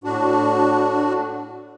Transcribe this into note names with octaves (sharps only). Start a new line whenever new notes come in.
A2 D4 F#4